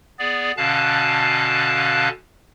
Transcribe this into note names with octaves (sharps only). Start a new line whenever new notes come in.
B3 G#4 D5
B2 D3 C#4 F5 A5 F#6